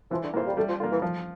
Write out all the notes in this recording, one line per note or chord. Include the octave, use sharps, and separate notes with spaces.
E3 F3
D3
E3 A#3 F4 C5
G3
G3 A3
F3
D3 A#3 F4
E3
F3